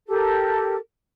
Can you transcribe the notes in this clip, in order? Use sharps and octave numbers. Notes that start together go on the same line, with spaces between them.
G4 A4 A#4